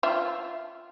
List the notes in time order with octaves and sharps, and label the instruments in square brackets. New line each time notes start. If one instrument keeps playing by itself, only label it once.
[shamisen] F4 E5